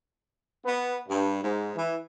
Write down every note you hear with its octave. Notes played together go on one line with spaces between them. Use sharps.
B3
G2
G#2
E3